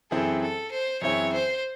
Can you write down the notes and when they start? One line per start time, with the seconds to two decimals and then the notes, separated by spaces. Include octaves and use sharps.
0.11 F#2 E3 C4 E4 G#4 A4
0.42 A4
0.72 C5
1.02 F#2 E3 C4 E4 G#4 C#5
1.32 C5